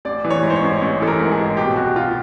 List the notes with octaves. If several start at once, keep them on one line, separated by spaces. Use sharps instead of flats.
A1 D5
E3
C#5
G#2
C5
C#5
A1
A1
E3 A4
A#4
G#2
G#4
A1
B2 G4
C2 F#4
B2 F4